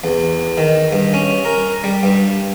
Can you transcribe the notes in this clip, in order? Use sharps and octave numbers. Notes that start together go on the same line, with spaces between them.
E2
D#3
G2
C#4
A#4
G3
G2